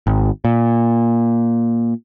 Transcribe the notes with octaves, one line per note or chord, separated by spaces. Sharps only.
G#1
A#2